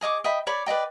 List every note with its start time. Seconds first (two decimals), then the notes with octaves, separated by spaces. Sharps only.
0.01 G#4 D#5 C#6 D6
0.24 D#5 E5 G5 B5
0.47 C#5 D5 B5
0.66 B4 D5 D#5 G5